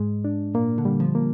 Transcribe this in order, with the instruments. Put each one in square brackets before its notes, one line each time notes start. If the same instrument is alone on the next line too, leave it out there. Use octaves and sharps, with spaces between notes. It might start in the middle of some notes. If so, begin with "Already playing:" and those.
Already playing: [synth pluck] G#2 [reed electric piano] G#3
[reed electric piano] D4
[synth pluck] A#2 [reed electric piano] A#3
[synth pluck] D3
[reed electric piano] G3
[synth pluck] F3
[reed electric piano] A#3